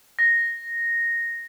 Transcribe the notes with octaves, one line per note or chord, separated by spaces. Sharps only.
A#6